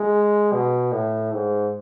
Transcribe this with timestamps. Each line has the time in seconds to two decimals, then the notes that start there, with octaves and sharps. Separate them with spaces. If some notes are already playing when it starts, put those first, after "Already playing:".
Already playing: G#3
0.52 B2
0.92 A2
1.32 G#2